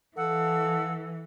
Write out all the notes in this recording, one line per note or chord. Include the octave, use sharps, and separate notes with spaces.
E3 A4 F5 F#5 E6